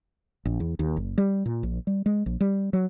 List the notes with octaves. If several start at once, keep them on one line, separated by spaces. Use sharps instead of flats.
A#1
E2
D#2
F#1
G3
A#2
A#1
G3
G#3
A#1
G3
F#3